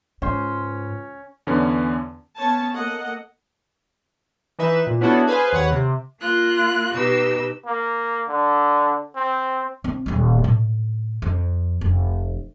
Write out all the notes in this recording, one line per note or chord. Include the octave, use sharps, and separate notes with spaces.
C#2 G#2 C#4 C5
E2 D3 B3 C#4
B3 C#4 C#5 A5
A#3 A4 D#5 F#5
E3 D#4 B4 E5 E7
A#2
B3 C#4 D4 E4 F#4 A4
G#4 B4 C5 F5 G#5
D#2 B4 C#5 F#5
C3
A#3 F4 F#6
B2 D#4 G4 B4 E6
A#3
D3
C4
C4 E4
D#1 G3
A2
F2
F1